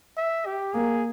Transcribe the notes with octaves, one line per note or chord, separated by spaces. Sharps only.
E5
G4
A#3 G#4